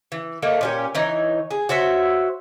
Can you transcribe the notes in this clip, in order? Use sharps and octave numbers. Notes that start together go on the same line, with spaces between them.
E3
A3 A#3 D#4
A#2 C#4 G4
E3 D#4 C#5
G#4
F#4 C5 C#5 E5